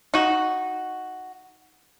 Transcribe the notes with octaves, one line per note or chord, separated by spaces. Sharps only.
D#4 F#4